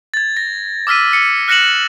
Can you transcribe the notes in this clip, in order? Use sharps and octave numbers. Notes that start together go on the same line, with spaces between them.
G#6 A6
A#6
D6 E6 F6 B6 D#7
C#7
F6 F#6 A#6 C#7 E7 F#7